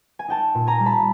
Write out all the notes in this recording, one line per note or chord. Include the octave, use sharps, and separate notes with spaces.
G#5
D#4 G5 A5
A#2
G#5 A#5
G3
A5 B5